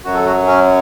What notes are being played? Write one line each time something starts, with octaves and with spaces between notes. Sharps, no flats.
F#2 F#3 F#4
A4
F#4
C#4